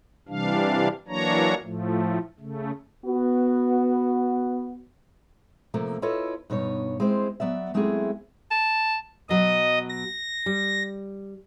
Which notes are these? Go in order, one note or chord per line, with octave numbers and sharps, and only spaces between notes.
C3 E3 G3 D4 F5
E3 F#3 A#3 D4 C#5 A#5
A2 F3 A3
C#3 A3
B3 F#4
C3 F3 A3 A#3
E4 F4 A4 B4 C#5 D#5
G2 B2 D#4 C#5
G#3 C4 E4 C5
F#3 B3 D5 E5
F#3 G#3 A3 C4 E4 G#4
A5
B2 F#3 D#5
A#6
G3